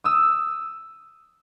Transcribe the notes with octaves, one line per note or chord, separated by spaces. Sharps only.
D#6 E6